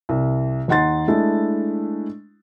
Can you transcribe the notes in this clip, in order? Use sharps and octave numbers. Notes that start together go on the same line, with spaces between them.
C2
D#2 D#4 F#5 C6 A6
G#3 A3 D4 E4